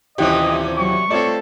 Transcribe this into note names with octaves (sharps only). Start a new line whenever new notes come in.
D#1 C3 E3 G3 C#4 G4 D#5
F#3 C#6
A3 C4 F4 A4 C#5 D5